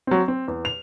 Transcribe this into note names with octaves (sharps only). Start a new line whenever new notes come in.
F#3 C4
C4
E2
F7